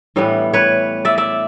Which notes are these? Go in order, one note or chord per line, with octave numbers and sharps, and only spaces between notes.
A2 E3 G3 B3
B4 C#5
D5 E5
D5 E5